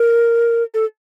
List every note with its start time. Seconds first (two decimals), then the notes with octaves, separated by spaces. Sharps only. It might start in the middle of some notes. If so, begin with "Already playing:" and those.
Already playing: A#4
0.74 A4